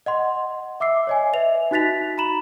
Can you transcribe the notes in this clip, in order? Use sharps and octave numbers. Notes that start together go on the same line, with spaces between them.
D#5 F#5 C6
E5 D6 E6 C7
C#5 D#5 G#5
B4 D#5 E5 F7
D#4 F#4 F#6 A6 B6 F7
A#5 B5 E7 F#7